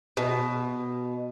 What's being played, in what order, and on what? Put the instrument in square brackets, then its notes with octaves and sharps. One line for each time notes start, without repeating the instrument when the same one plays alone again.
[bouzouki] B2